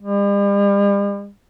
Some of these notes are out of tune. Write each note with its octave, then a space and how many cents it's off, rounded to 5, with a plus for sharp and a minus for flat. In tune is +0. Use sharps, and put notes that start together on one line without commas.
G3 +45